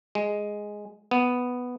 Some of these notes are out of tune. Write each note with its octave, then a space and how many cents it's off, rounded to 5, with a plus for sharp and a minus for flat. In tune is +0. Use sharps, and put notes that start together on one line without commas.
G#3 +0
B3 +0